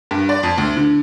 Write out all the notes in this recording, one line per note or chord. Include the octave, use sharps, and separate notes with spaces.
G2
D5
F2
D2
D3